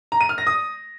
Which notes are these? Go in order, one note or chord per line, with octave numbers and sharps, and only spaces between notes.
A#5
D#7
F6
A#6
D#6